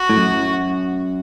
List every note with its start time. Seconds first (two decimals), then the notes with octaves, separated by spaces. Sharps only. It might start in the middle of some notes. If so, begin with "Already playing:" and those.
Already playing: F#4
0.09 A2
0.17 F#2